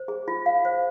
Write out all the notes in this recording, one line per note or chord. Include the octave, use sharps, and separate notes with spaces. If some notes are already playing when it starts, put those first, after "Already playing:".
Already playing: C5
G#4
F4
F5
C5